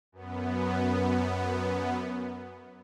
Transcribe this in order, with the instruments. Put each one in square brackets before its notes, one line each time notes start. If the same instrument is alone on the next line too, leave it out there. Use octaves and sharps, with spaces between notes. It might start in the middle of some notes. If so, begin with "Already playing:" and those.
[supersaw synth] F#2 B3